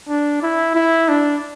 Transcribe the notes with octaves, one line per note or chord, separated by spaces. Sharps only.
D4
E4
E4
D4